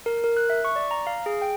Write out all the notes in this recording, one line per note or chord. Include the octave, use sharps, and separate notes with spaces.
A#4
A#4
F#6
E5
C#6
D5
A#5
F5
G#4
G5